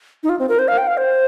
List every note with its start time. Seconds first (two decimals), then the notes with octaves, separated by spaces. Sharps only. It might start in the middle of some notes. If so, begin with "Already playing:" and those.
0.23 D#4
0.29 F4
0.39 C4
0.49 A#4
0.59 C5
0.68 F5
0.78 G5
0.87 F5
0.97 C5